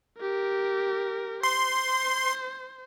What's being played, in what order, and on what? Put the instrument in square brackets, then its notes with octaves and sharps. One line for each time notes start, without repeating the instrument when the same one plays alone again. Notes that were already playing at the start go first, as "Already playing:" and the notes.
[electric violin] G4 A#4
[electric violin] C5 [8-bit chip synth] C6